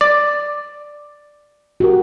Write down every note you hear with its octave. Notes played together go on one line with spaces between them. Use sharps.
D5
F#4 G4 A#4